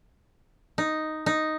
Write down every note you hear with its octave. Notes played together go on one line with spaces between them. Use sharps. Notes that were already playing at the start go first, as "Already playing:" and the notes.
D#4
D#4